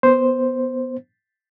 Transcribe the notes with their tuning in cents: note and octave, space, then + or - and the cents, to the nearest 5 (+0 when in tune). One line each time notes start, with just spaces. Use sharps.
B3 +0 C5 +0